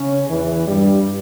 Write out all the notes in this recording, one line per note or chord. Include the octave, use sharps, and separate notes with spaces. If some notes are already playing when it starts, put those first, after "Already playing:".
Already playing: C#3 C#4
E2 E3
G2 G3